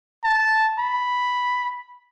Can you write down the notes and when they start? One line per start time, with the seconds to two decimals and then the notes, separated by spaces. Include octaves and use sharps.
0.24 A5
0.79 B5